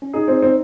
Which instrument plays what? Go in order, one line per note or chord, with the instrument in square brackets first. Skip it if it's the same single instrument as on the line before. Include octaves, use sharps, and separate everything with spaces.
[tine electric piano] C#4
[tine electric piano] D#4 [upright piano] G#4
[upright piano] C4
C4